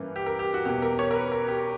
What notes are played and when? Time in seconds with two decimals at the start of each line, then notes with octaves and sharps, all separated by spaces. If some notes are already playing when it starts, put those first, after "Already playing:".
Already playing: G2 E3 A#3 C#4
0.16 G4
0.26 A#4
0.39 G4
0.54 F#4
0.65 E2 B2 A#3 G4
0.82 A#4
0.99 C#5
1.11 A#4
1.15 B4
1.32 A#4
1.48 G4